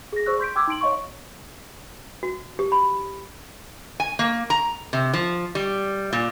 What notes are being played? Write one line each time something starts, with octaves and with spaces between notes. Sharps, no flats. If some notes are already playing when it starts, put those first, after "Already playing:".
G#4 A#6
G#4 C5 D5 C#6 E6 F#6
C6 G6 B6 D7
G5 C6 D6 E6 F#6 G#6
D#4 C6 D7 F#7
C#5 D#5 F5 C6 C#6
F#4
G4
B5
G#5
A#3
A#5
C3
F3
G3
A#2